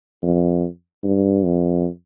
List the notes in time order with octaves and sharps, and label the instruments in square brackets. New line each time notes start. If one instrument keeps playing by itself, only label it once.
[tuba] F2
G2
F2